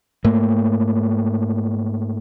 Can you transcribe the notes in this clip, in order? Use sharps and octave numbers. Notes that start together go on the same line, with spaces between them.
G#2 A3 A#3